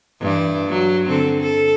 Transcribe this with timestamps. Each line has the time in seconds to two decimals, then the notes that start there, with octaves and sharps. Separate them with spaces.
0.20 G2 E3 D5
0.67 F#3
1.09 D3 C4 A4
1.40 A4